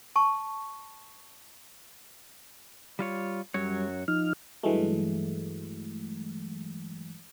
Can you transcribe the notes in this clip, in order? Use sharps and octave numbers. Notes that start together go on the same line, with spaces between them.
A5 C#6
G3 F4 C#5
F#2 F#3 G3 C#5
F3 D#4 F6
G2 E3 F#3 G#3 A3